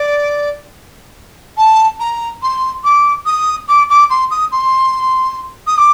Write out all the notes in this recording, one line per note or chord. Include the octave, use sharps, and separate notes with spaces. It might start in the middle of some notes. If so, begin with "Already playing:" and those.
Already playing: D5
A5
A#5
C6
D6
D#6
D6
D6
C6
D#6
C6
D#6
D6